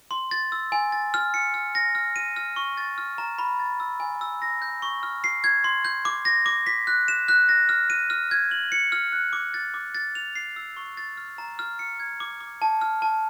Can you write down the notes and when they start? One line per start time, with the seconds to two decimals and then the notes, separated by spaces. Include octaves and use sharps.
0.11 C6
0.31 A6
0.52 E6
0.72 G#5
0.92 A6
1.14 F6
1.34 C#7
1.54 F6
1.75 A#6
1.95 F6
2.16 D#7
2.36 F6
2.56 C#6
2.78 A6
2.98 F6
3.18 A#5
3.39 B5
3.60 A6
3.80 E6
4.00 G#5
4.21 E6
4.42 A#6
4.62 G6
4.82 C#6
5.03 F6
5.24 C7
5.44 G#6
5.64 C6
5.85 G6
6.05 D6
6.25 A#6
6.46 D6
6.66 B6
6.87 F#6
7.08 E7
7.28 F#6
7.49 A#6
7.69 F6
7.90 D#7
8.10 F6
8.31 G#6
8.51 F#7
8.72 C#7
8.92 F6
9.12 F#6
9.33 D6
9.54 A6
9.74 D6
9.95 A6
10.15 F7
10.35 C7
10.56 E6
10.77 C#6
10.97 A6
11.17 F6
11.38 A#5
11.59 F6
11.79 C#7
12.00 G#6
12.20 D6
12.40 D6
12.62 A5
12.82 F6
13.02 A5